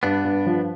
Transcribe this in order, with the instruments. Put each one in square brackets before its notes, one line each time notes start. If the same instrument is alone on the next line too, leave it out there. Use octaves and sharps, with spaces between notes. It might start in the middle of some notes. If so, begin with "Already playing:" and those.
[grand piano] G2 [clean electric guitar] B3 D4
[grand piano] G2
F3